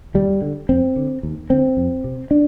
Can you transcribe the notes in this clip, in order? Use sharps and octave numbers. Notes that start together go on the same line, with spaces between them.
D#2 G3
D3
F2 C4
D3
D#2
D3 C4
F2
C3
D4